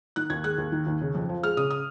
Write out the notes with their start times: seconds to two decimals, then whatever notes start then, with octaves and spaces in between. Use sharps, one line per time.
0.16 D#3 F#6
0.30 D#2 G#6
0.44 G#3 F#6
0.58 D#2
0.72 D#3
0.87 D#2
1.01 C#3
1.15 F2
1.29 F3
1.43 G#3 F6
1.57 C#3 D#6
1.70 D#6